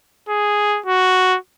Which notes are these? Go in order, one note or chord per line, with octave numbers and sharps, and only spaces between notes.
G#4
F#4